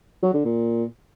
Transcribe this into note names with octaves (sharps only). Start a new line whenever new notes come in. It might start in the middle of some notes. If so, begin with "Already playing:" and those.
F#3
D3
A#2